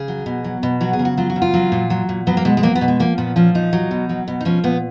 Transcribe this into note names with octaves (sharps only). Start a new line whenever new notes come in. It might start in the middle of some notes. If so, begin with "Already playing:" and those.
Already playing: C#3 G#4
F#3
B2
F#3
B2
F#3 F#4
G#4
C#3
F#4
F#3 F4
F#4
C#3
F4
F#3
A#2
F#3
A#2
F#3 B3
A#3
B2 G#3
G#3
F#3 A#3
B3
B2
G#3
F3 A#3
A#2 B3
F3 C#4
A#2 D#4
F#3
B2
F#3
B2
D#4
F3 C#4
A#2 B3